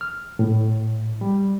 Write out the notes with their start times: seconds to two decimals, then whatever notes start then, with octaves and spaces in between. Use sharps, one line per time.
0.01 F6
0.39 A2
1.21 G3